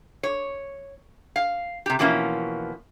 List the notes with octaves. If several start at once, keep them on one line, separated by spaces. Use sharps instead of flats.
C#5
F5
C3 G4
B2 E3 F3 A#3 B3 C#4